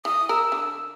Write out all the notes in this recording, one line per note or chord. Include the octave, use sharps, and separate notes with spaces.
E3 D#6
A#4 E6
D3